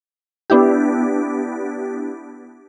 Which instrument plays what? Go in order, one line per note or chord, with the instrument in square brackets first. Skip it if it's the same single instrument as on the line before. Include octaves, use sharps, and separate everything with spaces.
[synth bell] B3 D4 E4 G4